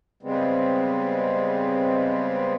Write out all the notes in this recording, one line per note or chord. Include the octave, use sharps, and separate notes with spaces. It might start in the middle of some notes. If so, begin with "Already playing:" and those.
C#3 G3 G#3 B3 C4